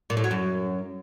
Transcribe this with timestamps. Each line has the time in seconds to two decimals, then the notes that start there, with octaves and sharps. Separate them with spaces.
0.10 A#2
0.17 A2
0.24 F#3
0.31 F#2